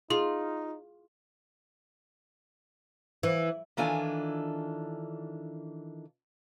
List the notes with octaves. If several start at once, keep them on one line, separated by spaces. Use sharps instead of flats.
D#4 F4 G#4
E3
D#3 E3 D4 F4 A4 G#5